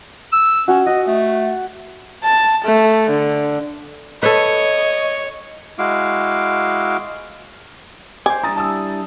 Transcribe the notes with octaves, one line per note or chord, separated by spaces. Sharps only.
E6
C#4 F#4
F#4 D#5
A3
A5
A3
D3
A4 B4 C#5 D#5
G#3 E4 F#4 F5 D6
C5 G#5 D6
G3 D4 E4 A#5 D#6 A6
A5 D#6 E6